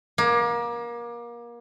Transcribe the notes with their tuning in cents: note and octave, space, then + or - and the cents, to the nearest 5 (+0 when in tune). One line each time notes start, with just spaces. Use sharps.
A#3 +30